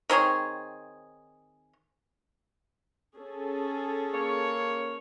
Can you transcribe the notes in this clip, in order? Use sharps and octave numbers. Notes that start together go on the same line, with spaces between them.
D#3 C4 G#4 C#5
C#4 G#4 A4
A#3 C#5